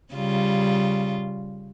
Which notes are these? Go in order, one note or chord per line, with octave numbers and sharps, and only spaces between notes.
C#3 G3 F4